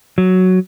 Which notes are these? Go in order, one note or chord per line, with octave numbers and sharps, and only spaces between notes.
F#3